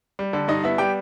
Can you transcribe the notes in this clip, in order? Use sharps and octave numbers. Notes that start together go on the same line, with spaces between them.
G3
D3
G2 D#4 D#5
B3 E4 E5
G3 G4 G5